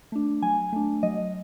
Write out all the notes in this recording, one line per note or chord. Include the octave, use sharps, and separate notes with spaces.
A3 D4
F#3 G#5
A3 D4
F#3 D#5